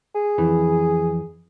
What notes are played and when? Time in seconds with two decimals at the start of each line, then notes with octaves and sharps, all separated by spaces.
0.15 G#4
0.38 F2 E3